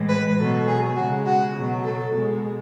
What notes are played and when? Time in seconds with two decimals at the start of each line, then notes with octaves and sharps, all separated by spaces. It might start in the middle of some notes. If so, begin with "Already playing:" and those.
Already playing: A2 E3 G#3
0.09 B4
0.38 B2 F#3 A4
0.67 G#4
0.96 C#3 G#3 F#4
1.25 F#4
1.55 B2 F#3
1.84 A4
2.13 B2 G#3